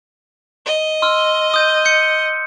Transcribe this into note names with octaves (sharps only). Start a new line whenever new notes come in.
D#5
C6 E6 F6
D#6 G6 D#7
G6 C#7